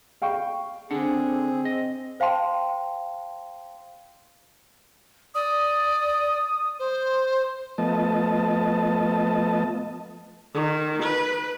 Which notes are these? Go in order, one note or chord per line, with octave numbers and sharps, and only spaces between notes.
F5 G5 C#6
D3 C4 D4 G#4 F#5
D#5
C5 F5 G5 A5 C6
D5 D#6
C5
F3 A3 B3 D#5 A5
D#3
B4